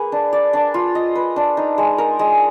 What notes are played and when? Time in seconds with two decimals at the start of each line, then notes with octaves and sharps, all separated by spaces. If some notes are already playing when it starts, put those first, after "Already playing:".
Already playing: A#3 G#4 B4
0.12 D4
0.33 D5
0.53 D4
0.74 F4
0.95 D#5
1.15 B4
1.36 D4
1.57 D#4
1.78 G#3
1.98 A#4
2.19 G#3